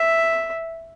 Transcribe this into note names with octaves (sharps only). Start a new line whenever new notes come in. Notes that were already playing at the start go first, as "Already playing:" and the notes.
Already playing: E5